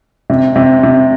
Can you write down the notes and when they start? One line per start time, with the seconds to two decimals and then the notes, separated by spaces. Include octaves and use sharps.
0.30 C3
0.56 C3
0.83 C3